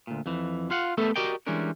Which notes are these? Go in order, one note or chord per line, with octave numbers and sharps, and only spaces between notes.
D2 A#2
F2 E3
F4 F5 F#5
G3 A3 B3 A4 E5
F#4 G4 A#4 D5 D#5 G5
E3 G3 G#3 C#4 D4 A#4